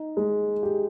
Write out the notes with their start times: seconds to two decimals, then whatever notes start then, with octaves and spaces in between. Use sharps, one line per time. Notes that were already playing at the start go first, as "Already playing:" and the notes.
Already playing: D#4
0.17 G#3
0.63 G4